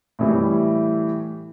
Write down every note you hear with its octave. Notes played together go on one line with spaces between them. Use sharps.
A2 E3 G3